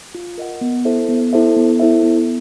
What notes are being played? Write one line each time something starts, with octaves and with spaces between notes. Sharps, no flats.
F4
A#4 D#5 F#5
B3
E4 A4 C5 E5
B3
E4 A4 C5 E5
B3
E4 A4 C5 E5
B3